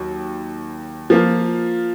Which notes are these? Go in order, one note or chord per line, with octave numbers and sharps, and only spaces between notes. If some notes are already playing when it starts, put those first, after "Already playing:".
Already playing: D#2 F#3
F3 A#3 F4